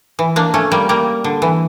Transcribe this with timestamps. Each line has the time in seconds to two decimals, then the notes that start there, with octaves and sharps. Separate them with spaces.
0.19 E3
0.36 A#3 D4
0.54 A3 C#4
0.72 G3 A#3
0.89 G3 A#3
1.24 D3
1.42 E3